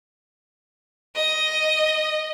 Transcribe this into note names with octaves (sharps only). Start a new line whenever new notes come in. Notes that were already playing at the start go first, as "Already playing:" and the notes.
D#5